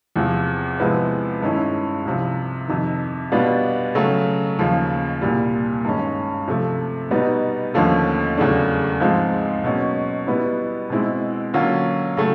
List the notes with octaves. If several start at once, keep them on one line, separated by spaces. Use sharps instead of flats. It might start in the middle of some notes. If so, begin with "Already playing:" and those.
E2 C3 F3
C3 F3 G#3 B3 E4
G2 D#3 G#3 C#4 E4
C2 C3 F3
F2 C3 D#3
B2 G3 B3 D4 F4
C#3 F#3 A3
D#2 C#3 F3
C2 A#2 G3
G2 D#3 G#3 C#4
C3 F3 A3
B2 G3 B3 D#4
D#2 D3 F3 A3 C#4
E2 C#3 F#3 A3 D4
G#2 F3 G#3 C4 F4
B2 F#3 A#3 C#4
B2 G3 B3 E4
B2 G#3 C4 E4
D3 F#3 A#3 C#4 F4
C#3 F#3 A3